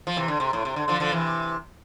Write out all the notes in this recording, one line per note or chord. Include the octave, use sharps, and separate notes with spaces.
F3
C3 E3
D3
C3
A2
C3
D3
D3 F3
D3 F3
C3 E3